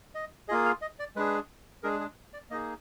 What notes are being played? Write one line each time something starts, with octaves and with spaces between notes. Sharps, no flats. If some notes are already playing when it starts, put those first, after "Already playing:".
D#5
A#3 F4 G#4 D#5
F5
D#5
D5
G#3 D4 G#4 B4
G#3 D4 G#4 A#4
G#4
D5
A#3 D#4 G#4 D#5